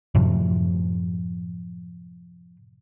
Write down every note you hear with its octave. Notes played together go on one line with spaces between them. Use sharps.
F#2 A2 C3 F3